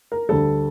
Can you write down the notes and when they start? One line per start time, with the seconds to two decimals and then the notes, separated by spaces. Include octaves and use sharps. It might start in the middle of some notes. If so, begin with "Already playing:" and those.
0.12 A#4
0.29 D2 D3 G3 A4